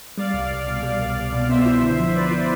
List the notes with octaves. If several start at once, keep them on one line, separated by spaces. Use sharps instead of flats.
G3 D5 F5
C2
C2
B2
G3
C2
C2
B2
B3 C5 E5
E4
D3
F3
B3 B4 D5
E4